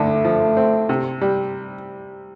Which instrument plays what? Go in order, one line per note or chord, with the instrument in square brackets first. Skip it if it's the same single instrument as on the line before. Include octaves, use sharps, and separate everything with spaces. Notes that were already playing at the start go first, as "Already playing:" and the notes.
Already playing: [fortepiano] D2 D3 [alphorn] A3
[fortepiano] F3
C4
C3
G3